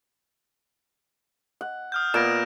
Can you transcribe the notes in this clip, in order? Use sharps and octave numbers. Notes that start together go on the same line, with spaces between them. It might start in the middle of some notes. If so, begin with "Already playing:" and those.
F#5
D#6 F6 G6
A#2 B3 A#6 D7 E7